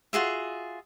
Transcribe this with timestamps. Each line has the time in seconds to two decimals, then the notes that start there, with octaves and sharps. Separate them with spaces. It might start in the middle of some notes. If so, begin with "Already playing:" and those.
0.13 F4 F#4 G#4 E5